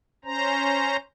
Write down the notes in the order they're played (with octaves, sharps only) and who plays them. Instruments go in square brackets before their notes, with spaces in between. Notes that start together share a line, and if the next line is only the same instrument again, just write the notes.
[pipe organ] C#4 C5 A#5